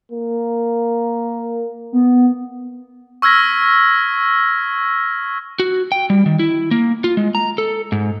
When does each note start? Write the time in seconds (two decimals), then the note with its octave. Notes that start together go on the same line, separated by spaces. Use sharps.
0.12 A#3
1.93 B3
3.22 C#6 E6 F6 G#6 A#6 B6
5.60 F#4
5.92 G5
6.10 G3
6.26 D#3
6.39 E4
6.71 A#3
7.04 F4
7.17 G#3
7.35 A#5
7.58 A4
7.92 G#2